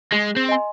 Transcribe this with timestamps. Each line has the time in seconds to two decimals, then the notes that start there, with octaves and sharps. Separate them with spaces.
0.13 G#3 G#4
0.36 C4
0.49 D#5 G#5 C6